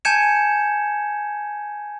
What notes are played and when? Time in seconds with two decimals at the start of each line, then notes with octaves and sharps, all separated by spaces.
0.05 G#5 A5 G6 G#6 C#7 E7